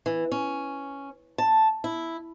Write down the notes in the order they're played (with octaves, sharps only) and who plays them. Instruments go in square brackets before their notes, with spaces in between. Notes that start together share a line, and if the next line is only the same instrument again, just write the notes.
[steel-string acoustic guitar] E3
C#4
A5
E4